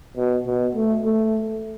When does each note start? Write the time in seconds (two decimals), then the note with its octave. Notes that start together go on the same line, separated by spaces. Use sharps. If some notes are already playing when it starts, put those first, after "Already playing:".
0.17 B2
0.46 B2
0.75 A3
1.05 A3